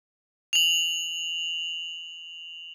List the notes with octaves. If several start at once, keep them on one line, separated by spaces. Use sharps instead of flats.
F7 F#7